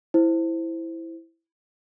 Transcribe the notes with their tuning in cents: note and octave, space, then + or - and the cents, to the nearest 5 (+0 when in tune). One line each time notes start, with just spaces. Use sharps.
E4 +0 C5 +0